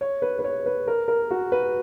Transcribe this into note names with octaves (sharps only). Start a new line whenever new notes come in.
C#5
B4
B4
C#5
B4
A#4
A#4
F#4
B4